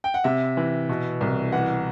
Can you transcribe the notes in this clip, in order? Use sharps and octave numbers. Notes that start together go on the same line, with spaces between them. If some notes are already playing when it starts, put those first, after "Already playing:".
G5
F#5
C3 E5
E3
B2
C2
E3 F#5